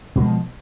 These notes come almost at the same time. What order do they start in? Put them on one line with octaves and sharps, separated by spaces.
B2 G#3 F3